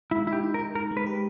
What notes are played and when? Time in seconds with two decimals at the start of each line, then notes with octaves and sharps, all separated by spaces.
0.11 G#3 E4
0.27 D#4 E4
0.33 G4
0.43 D#4
0.54 A#4
0.59 D#4
0.75 G#3 A#4
0.91 G#3
0.97 B4
1.06 G4